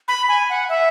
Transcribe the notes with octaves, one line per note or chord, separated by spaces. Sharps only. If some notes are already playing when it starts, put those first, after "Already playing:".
B5
G#5
F#5
E5